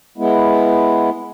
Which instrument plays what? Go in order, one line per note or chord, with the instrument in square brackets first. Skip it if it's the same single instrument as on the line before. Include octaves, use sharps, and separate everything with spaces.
[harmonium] G#3 B3 E4